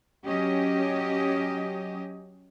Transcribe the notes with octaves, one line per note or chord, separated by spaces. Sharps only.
F#3 C#4 G4 D#5